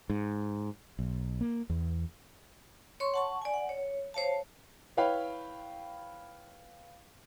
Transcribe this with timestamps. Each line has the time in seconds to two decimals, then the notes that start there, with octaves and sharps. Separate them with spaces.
0.10 G#2
0.99 B1
1.41 A#3
1.70 E2
3.00 C#5 C6 C#6
3.14 F#5 A5 C#6
3.42 D5 G#5
3.54 F#5
3.69 C#5
4.14 C5 C#5 F5 A5
4.97 E4 B4 C#5 F5 G5 B5